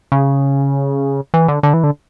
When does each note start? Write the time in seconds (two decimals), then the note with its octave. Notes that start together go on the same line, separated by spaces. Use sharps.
0.12 C#3
1.34 E3
1.48 D3
1.63 D3
1.74 E3
1.84 D3